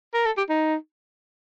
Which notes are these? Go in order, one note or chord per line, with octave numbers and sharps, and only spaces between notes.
A#4
A4
G4
D#4